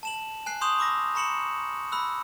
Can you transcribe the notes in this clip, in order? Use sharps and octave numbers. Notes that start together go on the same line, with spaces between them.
A5 E7 F#7
G#5 F#6 C7
C6 C#6 D#6 G6 E7 F7
B5 D6 E6 A#6
A#5 B5 C#6 C#7 E7 F#7
B5 E6 F#6